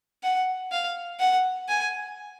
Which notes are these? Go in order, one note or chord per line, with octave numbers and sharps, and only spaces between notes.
F#5
F5
F#5
G#5